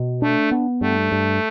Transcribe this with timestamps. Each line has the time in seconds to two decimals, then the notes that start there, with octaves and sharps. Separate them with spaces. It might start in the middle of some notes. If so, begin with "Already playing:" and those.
Already playing: B2
0.22 A3 D4
0.51 B3
0.81 G2 A3
1.12 G2